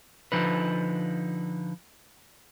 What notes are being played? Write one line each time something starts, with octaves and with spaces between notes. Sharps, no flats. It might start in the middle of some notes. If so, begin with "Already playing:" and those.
D3 F3 D#4 B4